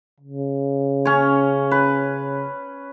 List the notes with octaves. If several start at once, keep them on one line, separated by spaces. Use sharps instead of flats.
C#3
C#4 C#5
B4